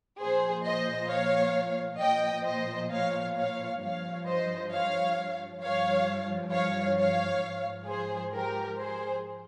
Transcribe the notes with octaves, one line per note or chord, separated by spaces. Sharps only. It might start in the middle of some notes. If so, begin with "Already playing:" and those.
A#2 F3 G#4 C5
C5 D#5
C#5 F5
A#2 F3 D#5 G5
C5 D#5
C#5 F5
C#5 F5
G2 F3 C#5 F5
C5 D#5
C#5 F5
G2 F3 C#5 F5
C#5 F5
C#5 F5
G#2 F3
G#4 C5
G4 A#4
G#4 C5